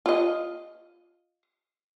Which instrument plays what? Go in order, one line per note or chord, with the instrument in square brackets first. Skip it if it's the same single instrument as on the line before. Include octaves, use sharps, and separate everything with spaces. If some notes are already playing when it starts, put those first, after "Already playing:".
[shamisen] F4 D#5